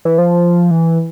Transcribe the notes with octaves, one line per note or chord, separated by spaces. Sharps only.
E3
F3
E3